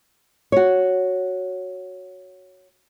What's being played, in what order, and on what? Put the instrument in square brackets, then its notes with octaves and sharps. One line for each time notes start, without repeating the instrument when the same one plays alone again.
[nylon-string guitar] F#4 C#5